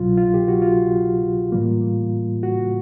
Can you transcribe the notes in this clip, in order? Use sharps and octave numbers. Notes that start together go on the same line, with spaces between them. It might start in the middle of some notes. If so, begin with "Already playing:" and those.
Already playing: C2 B2 F#3 F4
F4
G4
F#4
F4
A2 E3 G3 A#3
F#4